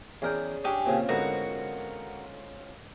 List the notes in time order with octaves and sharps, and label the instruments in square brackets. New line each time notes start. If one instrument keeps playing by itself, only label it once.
[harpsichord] E2 A#4 G5 [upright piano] C#4 G#4 D5
[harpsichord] C#4 D4 [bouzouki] G4 G#4 [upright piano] C#5
[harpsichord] A#2 C#3 [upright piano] C4 C#4 F4
[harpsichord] G#2 D3 B3 [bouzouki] F#4 A#4